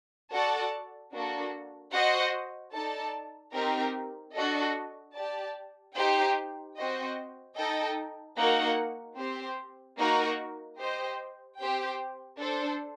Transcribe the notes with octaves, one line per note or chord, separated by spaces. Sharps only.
F#4 A4 D5 F#5 A5
A#3 D4 F#4 A4
F#4 C5 D#5 F#5
D#4 A4 D5 A5
C4 D#4 G4 A#4
D4 F#4 A4 D#5
G4 D5 A5
D#4 G4 C5 G5
C4 F#4 C5 D#5 G5
D#4 A4 D#5 G5
A#3 D#4 F#4 A#4 F#5
C4 G4 C5
A#3 D#4 F#4 A#4
G4 C5 D#5 G5
C4 G4 C5 G5
D4 A4 C5